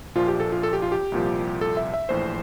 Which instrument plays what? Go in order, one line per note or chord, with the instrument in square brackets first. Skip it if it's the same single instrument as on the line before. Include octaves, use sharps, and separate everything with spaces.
[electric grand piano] A#1 A#2 F3 F4
G4
A4
F4
A4
G4
F4
G4
C2 A#2 F3
A4
E5
E5
A#1 A2 E3 C5